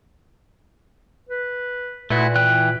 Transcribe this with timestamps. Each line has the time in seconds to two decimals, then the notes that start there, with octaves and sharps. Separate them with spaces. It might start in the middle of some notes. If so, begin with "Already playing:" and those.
1.29 B4
2.10 A#2 A3 E4 F#4 B4
2.35 E3 G5 F#6